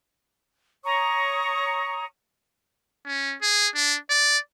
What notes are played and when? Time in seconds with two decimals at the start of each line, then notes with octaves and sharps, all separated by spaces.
0.85 C#5 A#5 C#6 D#6
3.06 C#4
3.42 G#4
3.75 D4
4.10 D5